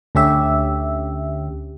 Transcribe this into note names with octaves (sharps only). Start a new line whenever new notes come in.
D2 D3 C#4 G4 E5